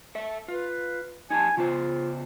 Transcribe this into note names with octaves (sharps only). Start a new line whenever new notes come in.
A4 E5
F4 B4
D#4 G4 G#5 A5
C#3 B3 F4 C5